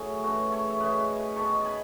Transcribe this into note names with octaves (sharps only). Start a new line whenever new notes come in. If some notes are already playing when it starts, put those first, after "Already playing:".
Already playing: A2 F#3 C#4 E4 G#4
C#3 E3 A3 F#4 A4
A4 C#5
E5
C#3 E3 A3 B4 D#5
D#3 G#3 B3 A5 C#6
G#5 B5